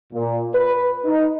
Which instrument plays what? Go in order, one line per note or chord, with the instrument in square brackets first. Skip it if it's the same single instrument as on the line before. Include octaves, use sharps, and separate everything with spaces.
[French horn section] A#2
B4
D#4